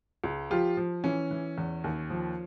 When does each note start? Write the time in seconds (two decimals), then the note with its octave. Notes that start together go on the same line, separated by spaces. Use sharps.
0.24 C#2
0.50 F3 F4 G4
0.77 F3
1.04 E3 C#4
1.31 E3
1.58 E2
1.84 D#2
2.10 F3